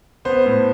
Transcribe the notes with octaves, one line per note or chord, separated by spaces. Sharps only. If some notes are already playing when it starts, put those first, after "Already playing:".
B3 C5
A2